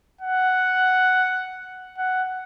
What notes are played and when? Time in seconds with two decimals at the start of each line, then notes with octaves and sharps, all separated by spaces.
0.21 F#5
1.98 F#5